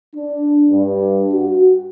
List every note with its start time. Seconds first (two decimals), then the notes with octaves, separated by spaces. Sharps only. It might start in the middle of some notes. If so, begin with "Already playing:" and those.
0.15 D4
0.71 G2
1.32 F#4